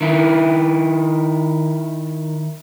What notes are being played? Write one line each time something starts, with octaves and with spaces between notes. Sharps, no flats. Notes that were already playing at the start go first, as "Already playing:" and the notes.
D#3 E4